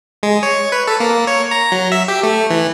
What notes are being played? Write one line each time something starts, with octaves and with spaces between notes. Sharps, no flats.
G#3
C#5
B4
A4
A#3
C#5
A#5
F#3
E5
G4
A3
E3